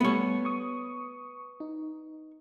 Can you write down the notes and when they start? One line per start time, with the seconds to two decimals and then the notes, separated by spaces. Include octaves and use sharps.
0.01 G3 A3 B3 C#5
0.45 C#6 D#6
1.60 D#4